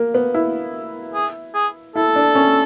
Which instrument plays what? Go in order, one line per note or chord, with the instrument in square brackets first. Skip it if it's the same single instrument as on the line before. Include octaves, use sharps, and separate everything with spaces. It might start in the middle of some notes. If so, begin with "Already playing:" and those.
Already playing: [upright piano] A#3
B3
E4
[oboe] G#4
G#4
[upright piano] E4 [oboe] A4
[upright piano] D4
C#4